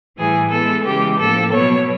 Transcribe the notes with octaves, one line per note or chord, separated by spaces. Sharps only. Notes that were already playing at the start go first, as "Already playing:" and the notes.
A2 E3 G3 G#4
E3 G#3 B3 A4
C#3 E3 G#3 G4
A2 F3 A#3 A4
B2 F#3 B3 C#5